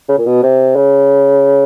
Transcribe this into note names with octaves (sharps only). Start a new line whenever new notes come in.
C#3
A#2
B2
C3
C#3